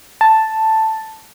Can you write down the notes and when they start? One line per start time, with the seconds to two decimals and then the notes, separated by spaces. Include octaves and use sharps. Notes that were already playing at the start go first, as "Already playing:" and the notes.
0.21 A5